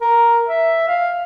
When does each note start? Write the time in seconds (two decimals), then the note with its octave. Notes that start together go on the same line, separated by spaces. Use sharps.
0.01 A#4
0.48 E5
0.88 F5